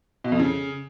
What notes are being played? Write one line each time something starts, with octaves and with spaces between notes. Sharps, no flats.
B2
F2
C#3